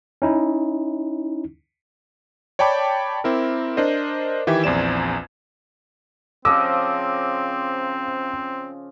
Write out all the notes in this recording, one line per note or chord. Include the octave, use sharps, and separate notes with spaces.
C#4 D#4 E4
C#5 D5 G5 A5 B5 D6
C4 E4 A#4
D4 A#4 C5 D#5
D#3 E3 G4 E5 G#6
A#1 E2 C4 D5 E7
C#3 F3 C4 D#5 D6 E6